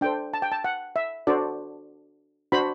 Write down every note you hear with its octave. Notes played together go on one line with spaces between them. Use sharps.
D4 A4 C5 G5
A5
G5
A5
F#5
E5
D4 F#4 A4 C5 D5
D4 F#4 C5 B5